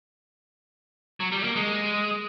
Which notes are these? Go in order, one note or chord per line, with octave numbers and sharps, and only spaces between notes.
F#3
G3
A#3
G#3